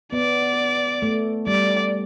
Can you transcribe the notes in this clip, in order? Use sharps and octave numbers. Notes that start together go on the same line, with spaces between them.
B3 D5
A3
G3 D5